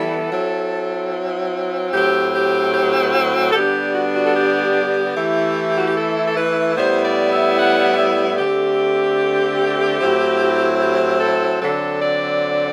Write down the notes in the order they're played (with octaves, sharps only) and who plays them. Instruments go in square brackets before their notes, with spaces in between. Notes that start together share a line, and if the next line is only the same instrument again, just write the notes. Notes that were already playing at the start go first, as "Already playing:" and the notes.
Already playing: [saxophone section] E3 G3 B3 E4 A4
F#3 C4 E4
A2 F#3 C4 G4
G4
G4
F#4
A4
D3 G3 B3 D4 G4
F#4
F#4
A4
G4
E3 A3 E4
F#4
G4
A4
A4
B4
A2 G3 B3 E4 C5
D5
E5
F#5
D5
E5
D3 A3 C4 G4
A2 F#3 C4 E4
G4
A4
D3 F#3 C4 A4
D5